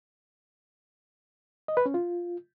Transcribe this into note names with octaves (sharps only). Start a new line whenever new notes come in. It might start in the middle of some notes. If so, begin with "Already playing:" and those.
D#5
B4
C#4
F4